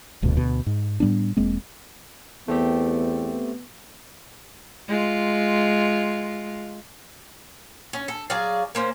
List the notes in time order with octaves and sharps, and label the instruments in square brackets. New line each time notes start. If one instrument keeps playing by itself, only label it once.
[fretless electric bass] D#1 D2 G2 B2
D2 B2
G#2
A2 G3 B3 D4
E1 G#3 A#3 C4
[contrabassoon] E2 [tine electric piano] A3 C4 G4 [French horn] B3
[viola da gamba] G#3 F4
[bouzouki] C#4
A4
F#3 G#4 D5 F5
A#3 C#4 C5